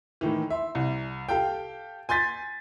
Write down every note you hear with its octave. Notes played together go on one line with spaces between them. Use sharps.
A2 D#3 E3
E5 C6
C2
G4 A4 F5 G5
G#5 C6 G6 A6 B6